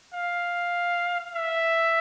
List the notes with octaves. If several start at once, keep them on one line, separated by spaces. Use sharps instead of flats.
F5
E5